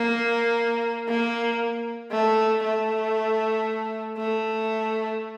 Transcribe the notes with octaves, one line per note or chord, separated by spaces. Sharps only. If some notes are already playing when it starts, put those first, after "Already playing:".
Already playing: A#3
A#3
A3
A3
A3